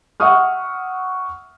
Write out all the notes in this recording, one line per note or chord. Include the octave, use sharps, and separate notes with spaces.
E5 F#5 C#6 D#6 F6